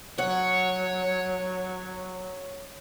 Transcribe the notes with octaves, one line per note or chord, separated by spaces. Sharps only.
F#3 C#5 F#5